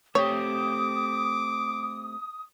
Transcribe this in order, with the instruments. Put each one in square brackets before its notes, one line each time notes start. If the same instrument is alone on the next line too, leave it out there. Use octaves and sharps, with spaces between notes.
[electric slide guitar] A3 C4 G4 [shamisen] C#5 [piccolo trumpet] D6 [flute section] D#6